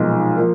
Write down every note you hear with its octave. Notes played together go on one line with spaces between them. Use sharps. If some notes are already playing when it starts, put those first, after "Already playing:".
Already playing: B1 A#2 F3 G#3 D#4
F3 A#3